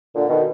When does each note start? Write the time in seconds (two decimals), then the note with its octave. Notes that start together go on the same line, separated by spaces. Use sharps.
0.15 A#2 D3
0.29 B2 D#3